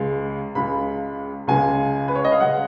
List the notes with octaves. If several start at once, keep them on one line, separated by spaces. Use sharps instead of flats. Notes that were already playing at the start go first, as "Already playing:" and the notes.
Already playing: C#2 C#3 G#3
C#2 C#3 G#3 B5
C#2 C#3 G#3 G#5
B4
C#5
D#5
F5
C#3 G#3 F#5